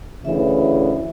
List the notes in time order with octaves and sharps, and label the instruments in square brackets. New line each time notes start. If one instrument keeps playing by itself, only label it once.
[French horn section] D2 C#3 E3 [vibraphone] E5